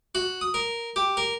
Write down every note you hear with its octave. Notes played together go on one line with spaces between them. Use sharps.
F#4
D#6
A#4
G4
A#4